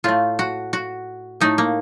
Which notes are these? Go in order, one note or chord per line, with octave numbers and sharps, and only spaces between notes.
A2 A3 F4
F#4
F#4
A2 A3 D#4
A#3